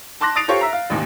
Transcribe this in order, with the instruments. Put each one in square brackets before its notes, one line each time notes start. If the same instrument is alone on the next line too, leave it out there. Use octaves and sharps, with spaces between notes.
[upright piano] A5 C6 D6 F#6 A#6
D#6 A6 C7 D7 F7
F4 G4 A4 C5 C#5
E5 A#5
F5
A1 D#2 A#2